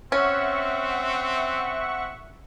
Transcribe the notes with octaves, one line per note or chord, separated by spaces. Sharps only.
C4 C#4 E5 F#5 C#6